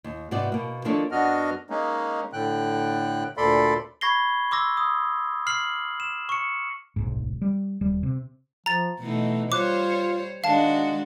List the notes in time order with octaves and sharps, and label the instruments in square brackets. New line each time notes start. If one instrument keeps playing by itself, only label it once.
[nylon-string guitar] D#2
G#2 C3 B3 F#4 D5
B2 A#3
D#3 F3 A#3 D4 A4 C#5
[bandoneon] F#2 B3 D4 F#4 D#5 F6
G#3 A#3 C#4 D#4
A2 D3 G5 F#6
D2 A#2 A4 D5 B5 C6
[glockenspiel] B5 C#6 G#6 A#6 C7 G7
C6 D6 E6 A#6
D#6
F6 C7 F#7
E7
C#6 C#7
[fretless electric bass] D1 B1 G#2
G3
D#1 G3
C3
[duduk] F3 [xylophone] A#5 A6
[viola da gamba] B2 E3 D#4 [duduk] A3
[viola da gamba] G3 C5 C#5 [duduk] F4 [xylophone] D6 F#6
[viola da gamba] D#3 D4 F#4 [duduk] G#3 [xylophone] F5 A5